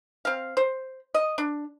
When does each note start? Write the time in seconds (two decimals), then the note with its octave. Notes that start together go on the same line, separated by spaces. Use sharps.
0.25 C4 F5
0.57 C5
1.14 D#5
1.38 D4